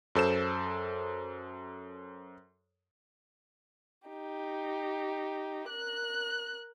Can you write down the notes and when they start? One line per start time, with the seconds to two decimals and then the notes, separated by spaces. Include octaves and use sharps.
0.15 F#2 A4 C5 E7
4.08 D#4 G4
5.69 A#4 F#6